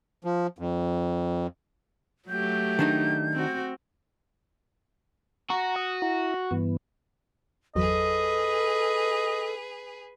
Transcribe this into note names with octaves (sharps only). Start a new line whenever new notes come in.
F3
F2
F#3 A3 G4 G6
D#3 D4 D#4
C4 F#4
F#4 A#5 C#6
F#5 D#6
E4 A#5
G2 E3 B3
G1 E2 F#3 G#4 A4 B4 D#5